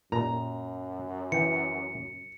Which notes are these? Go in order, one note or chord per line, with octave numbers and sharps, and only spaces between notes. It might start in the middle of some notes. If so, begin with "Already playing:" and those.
F#2 A#2 A#5
E3 G5 C#7